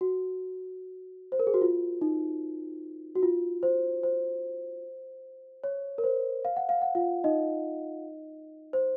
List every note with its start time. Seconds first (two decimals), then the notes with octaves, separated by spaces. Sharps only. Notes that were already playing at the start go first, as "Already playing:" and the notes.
0.01 F#4
1.32 C5
1.39 A#4
1.47 G#4
1.54 F#4
1.62 F4
2.02 D#4
3.15 F#4
3.23 F4
3.63 C5
4.03 C5
5.64 C#5
5.98 A#4
6.04 C5
6.45 F5
6.57 F#5
6.69 F5
6.82 F#5
6.95 F4 F5
7.24 D#4 D#5
8.73 C5